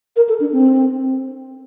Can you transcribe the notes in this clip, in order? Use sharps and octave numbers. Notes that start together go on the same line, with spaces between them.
A#4
A4
D4
C4